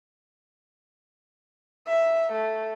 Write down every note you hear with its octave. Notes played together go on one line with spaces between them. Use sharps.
E5
A3